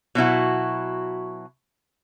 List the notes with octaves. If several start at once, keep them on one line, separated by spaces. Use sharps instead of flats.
B2 F#3 E4 F#4